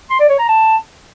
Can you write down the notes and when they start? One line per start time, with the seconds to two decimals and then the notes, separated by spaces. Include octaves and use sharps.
0.10 C6
0.20 D5
0.29 C#5
0.39 A#5
0.48 A5